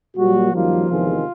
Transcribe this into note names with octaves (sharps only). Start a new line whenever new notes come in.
A#2 F#3 G3 A#3 F#4
F#2 D#3 F3 G3 A#3 F4
E2 C3 D#3 G#3